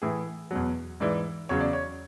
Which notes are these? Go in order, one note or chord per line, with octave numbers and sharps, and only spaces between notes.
A2 E3 G#4
E2 B2 F#3
G#2 E3 D5
E2 C#3 F#3 C#5
D5
C#5